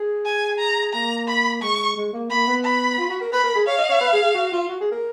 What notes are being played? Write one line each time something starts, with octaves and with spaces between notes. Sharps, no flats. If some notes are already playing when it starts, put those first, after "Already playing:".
Already playing: G#4
G#5
A#5
A#3 A#5
B5
G#3 C#6
G#3
A#3
A#3 B5
B3
B5
F4
F#4
A#4
B4 B5
A#4
G#4
C#5 F5
D#5
C#5
B4
G#4
G#4
F#4
F4
F#4
G#4
A#4